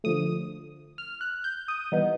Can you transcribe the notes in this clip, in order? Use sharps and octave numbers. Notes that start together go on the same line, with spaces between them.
D3 F3 A3 D#6
F6
F#6
G6
D#6
E3 G3 B3 D#4